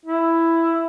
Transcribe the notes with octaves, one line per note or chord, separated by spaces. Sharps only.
E4